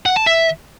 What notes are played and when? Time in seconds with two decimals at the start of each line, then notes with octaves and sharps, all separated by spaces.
0.06 F#5
0.16 A5
0.26 E5